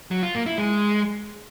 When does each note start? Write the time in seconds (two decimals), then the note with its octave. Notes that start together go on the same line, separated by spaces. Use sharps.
0.11 F#3
0.23 F4
0.34 A#3
0.46 E4
0.58 G#3